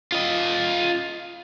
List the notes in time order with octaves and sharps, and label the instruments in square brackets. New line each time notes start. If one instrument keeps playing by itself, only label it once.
[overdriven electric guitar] F4 D#5